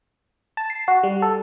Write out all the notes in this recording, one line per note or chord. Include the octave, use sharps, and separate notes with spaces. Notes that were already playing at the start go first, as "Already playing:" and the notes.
A5
C7
F#4
G3
A4